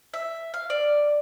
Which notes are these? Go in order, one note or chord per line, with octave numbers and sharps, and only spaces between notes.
E5
F5
D5